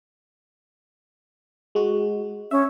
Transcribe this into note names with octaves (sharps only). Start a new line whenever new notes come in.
G#3 F#4
C#4 E5